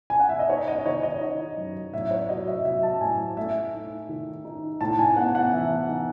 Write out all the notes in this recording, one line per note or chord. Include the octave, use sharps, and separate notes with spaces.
G#5
F#5
E5
D#5
D#4 C#5
D#5
D#3 C#5
D#5
D#4
F#2
A2 E5
C#5
F#3 D#5
E5
F#3 E5
A5
A2 G#5
A3 E5
D#4
D#3
D#4
A2 A5
G#5
B3 F#5
F#5
E3 E5
D#4